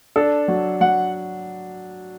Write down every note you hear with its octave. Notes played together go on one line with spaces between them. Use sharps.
D4 A4
F#3
F#3 F#5